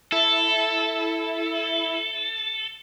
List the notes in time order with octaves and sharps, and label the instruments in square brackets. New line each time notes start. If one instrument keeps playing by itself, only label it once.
[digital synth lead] E4 [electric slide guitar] A4